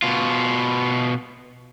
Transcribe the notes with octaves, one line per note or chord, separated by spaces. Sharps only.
B2 F4